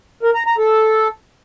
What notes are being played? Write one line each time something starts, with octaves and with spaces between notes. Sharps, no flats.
A#4
A#5
A#5
A4